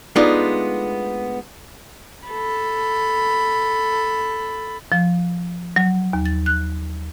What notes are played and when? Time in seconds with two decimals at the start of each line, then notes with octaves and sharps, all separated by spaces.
0.16 G#3 A3 B3 D4 D#4 F4
2.28 A4 B5
4.92 F3
5.76 F#3
6.13 D#2
6.26 A6
6.46 F#6